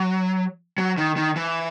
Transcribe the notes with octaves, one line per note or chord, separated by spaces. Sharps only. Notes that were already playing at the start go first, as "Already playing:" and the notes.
Already playing: F#3
F#3
D#3
D#3
E3